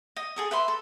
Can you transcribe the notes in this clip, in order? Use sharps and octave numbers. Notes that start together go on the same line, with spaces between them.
D#5
G#4 A4 D#6
B4 E5 B5 C6
A4